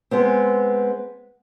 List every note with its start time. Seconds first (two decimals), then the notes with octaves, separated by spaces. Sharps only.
0.11 G#3 B3 C4